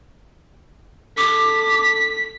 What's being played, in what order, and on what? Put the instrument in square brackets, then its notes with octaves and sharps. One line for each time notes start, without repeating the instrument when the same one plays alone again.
[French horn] A4 [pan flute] D6 [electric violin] B6